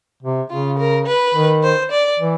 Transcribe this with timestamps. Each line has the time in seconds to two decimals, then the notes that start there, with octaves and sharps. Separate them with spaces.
0.23 C3
0.50 C#3 F4
0.78 A#4
1.07 B4
1.34 D#3
1.63 C5
1.91 D5
2.20 E3